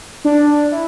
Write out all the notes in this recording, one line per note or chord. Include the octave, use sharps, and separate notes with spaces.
D4
E4